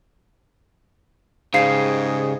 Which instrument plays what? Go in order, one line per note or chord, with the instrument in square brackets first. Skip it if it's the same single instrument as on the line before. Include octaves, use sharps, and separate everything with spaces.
[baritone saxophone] G#2 [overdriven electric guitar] C#3 [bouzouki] G3 G#3 G#4 [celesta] F5 C7